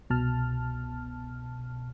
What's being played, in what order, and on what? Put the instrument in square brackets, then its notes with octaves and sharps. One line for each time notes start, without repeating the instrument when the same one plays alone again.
[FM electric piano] C2 B2 A5 F6